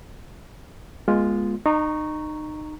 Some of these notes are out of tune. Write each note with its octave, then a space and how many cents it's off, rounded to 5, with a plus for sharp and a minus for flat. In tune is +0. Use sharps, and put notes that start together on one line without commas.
G#3 +0 B3 -35 F4 +5
D#4 -30 A#5 +0 C#6 +0